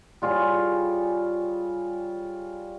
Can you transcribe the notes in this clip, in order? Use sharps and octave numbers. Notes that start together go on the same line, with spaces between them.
G3 F4 G#4 C#5